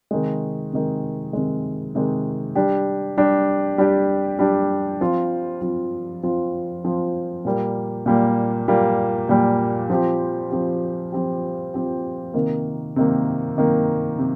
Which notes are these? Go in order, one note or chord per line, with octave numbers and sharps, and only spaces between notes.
C3 D#3 G#3
C3 D#3 G#3
C3 D#3 G#3
C3 D#3 G#3
G3 D4 G4
G3 D4 G4
G3 D4 G4
G3 D4 G4
F3 C4 F4
F3 C4 F4
F3 C4 F4
F3 C4 F4
A#2 G3 A#3
A#2 G3 A#3
A#2 G3 A#3
A#2 G3 A#3
F3 C4 G4
F3 C4 G4
F3 C4 G4
F3 C4 G4
C3 D#3 A#3
C3 D#3 A#3
C3 D#3 A#3
C3